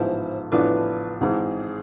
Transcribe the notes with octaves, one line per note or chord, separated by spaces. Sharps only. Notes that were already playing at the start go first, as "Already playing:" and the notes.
Already playing: A1 G#2 F3 B3 E4 C5
A1 A2 F3 B3 D4 B4
G#1 G#2 E3 G#4